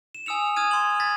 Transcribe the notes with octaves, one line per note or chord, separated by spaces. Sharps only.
E7
G#5 D#6 E6 C#7 F7
D#6 F6 G#6 D#7
C6 F#7
G#6 A6 B6